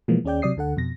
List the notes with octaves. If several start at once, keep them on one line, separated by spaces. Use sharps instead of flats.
B2 E3 F3 G#3 A#3 B3
D#2 C#4 G#4 D5 G5 G6
C3 F#3 D5 D#6 C7
D2 D3 A4 F#5
F2 B2 A#6